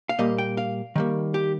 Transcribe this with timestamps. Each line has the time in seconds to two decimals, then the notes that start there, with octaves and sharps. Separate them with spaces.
0.09 F5
0.19 A#2 G3 A#3 D#5
0.38 G5
0.57 F5
0.96 D#3 G3 A#3
1.34 G4